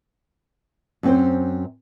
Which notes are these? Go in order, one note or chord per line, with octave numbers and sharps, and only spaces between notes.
F#2 C4 C5